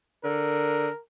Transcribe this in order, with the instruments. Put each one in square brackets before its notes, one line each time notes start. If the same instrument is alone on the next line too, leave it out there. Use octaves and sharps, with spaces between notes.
[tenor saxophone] D3 [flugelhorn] A#4